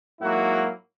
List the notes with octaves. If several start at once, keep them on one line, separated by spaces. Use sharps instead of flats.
G#2 F#3 A#3 E4 F#4